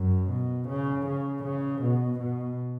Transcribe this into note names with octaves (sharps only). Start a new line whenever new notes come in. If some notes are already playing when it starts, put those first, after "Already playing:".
Already playing: F#2
B2
C#3
C#3
C#3
B2
B2